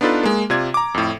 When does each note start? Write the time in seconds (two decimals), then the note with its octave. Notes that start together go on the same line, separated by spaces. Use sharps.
0.01 B3 D4 D#4 F4 A4 B4
0.23 G#3 A#3
0.50 C3 F4 D5 G#6
0.74 A#5 D6
0.94 F2 A2